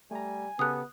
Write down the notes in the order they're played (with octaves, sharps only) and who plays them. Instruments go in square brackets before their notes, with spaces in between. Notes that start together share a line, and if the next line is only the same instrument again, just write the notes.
[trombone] G3 [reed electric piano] A3 A#5 [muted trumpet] G#5
[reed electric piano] C#3 G4 A4 [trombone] B3 [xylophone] D#6 F#6